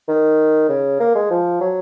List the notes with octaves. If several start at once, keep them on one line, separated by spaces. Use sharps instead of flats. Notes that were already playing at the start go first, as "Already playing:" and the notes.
D#3
C#3
A#3
G#3
F3
F#3